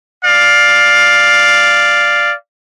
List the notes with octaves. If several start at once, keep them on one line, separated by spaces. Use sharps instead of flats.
D5 F5